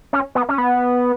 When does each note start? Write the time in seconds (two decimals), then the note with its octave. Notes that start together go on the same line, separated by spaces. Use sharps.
0.13 C#4
0.35 B3
0.49 C#4
0.58 B3